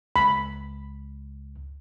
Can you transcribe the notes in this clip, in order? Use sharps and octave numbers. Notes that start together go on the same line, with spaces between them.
C#2 B5